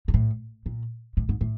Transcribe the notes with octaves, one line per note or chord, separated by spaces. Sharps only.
G#2
A2
A#2
A2
G#2
A2